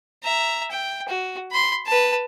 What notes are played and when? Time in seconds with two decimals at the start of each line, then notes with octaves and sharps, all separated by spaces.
0.24 E5 A#5
0.71 G5
1.09 F#4
1.52 B5 C6
1.87 B4 A5